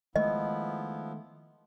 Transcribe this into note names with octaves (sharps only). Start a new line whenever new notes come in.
D#3 F3 G#3 A3 B3 E4 D#5